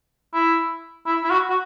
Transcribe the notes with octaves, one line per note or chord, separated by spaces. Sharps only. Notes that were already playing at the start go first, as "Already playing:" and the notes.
E4
E4
E4
F#4
F#4